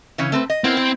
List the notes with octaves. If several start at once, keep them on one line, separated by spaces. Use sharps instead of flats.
C#3 E3 C#4
A3 C4 B4
D#5
B3 C4 E4 A#4
E4